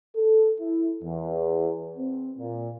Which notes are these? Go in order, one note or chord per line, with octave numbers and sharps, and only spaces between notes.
A4
E4
E2
C4
A#2